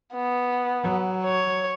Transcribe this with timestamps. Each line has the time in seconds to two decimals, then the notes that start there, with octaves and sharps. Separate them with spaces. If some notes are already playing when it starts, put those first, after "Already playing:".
0.14 B3
0.83 F#3
1.25 C#5